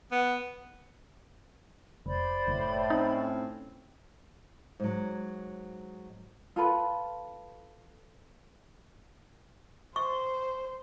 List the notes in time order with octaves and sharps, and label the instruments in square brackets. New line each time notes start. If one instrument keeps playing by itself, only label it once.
[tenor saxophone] B3
[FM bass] F1 [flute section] C5 D5 B5
[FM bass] F#1 [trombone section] A2
[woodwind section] C4 C#4 [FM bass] D#4
[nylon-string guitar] G#2 F#3
[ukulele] F4 A4 B4
[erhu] C5 [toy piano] C#6